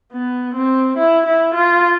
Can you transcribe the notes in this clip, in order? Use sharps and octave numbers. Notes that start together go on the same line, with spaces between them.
B3
C4
E4
E4
F4